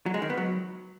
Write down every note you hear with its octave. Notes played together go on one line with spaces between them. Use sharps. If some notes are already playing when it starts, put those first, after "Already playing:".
F#3
G#3
D#3
B3
F#3